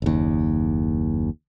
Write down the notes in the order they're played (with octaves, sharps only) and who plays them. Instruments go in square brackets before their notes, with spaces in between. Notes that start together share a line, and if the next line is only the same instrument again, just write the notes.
[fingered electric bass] F#1 D#2